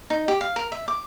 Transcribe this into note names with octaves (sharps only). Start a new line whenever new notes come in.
D#4
G4
F5
A#4
E5
D6